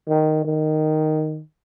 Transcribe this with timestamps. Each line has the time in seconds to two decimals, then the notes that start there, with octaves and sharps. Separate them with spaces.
0.08 D#3
0.45 D#3